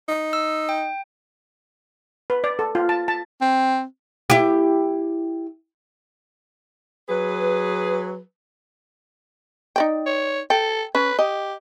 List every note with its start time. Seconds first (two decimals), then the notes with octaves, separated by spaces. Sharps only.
0.08 D#4
0.33 E6
0.69 G5
2.30 B4
2.44 D5
2.59 A4
2.75 F4
2.89 A5
3.08 A5
3.41 C4
4.30 E4 G4
7.09 F#3 G#4 B4
9.76 D#4 D5 G5
10.06 C#5
10.50 A4 G5
10.95 C#4 B4
11.19 G4 D#5